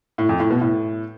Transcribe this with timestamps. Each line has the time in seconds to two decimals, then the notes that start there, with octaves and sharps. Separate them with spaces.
0.18 A2
0.29 F2
0.40 A2
0.50 B2
0.61 A2